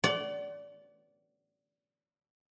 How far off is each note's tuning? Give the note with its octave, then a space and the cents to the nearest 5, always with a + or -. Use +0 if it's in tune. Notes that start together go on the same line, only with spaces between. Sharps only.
D5 -20 F#5 +35